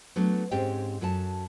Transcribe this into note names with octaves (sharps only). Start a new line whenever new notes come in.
F#3 A3 B3 D4
G#2 C4 C#4 G4 G5
F#2 F#4 A4 A5